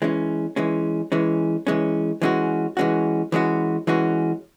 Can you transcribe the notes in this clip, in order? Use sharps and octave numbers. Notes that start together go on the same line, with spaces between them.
E3 G#3 C#4
E3 G#3 C#4
E3 G#3 C#4
E3 G#3 C#4
E3 G#3 C#4 F#4
E3 G#3 C#4 F#4
E3 G#3 C#4 F#4
E3 G#3 C#4 F#4